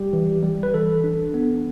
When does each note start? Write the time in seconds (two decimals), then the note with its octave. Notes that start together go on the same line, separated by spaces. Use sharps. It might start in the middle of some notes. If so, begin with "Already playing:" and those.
Already playing: G3 G4
0.13 E3
0.43 G3
0.63 B4
0.74 E3 A4
1.04 D4
1.34 B3